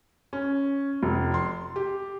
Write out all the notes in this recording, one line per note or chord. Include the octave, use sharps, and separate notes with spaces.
C#4
F1
C6
G4